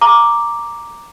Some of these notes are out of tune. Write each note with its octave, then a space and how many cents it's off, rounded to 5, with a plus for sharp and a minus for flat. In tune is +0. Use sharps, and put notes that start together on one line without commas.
A#5 +0 D6 +0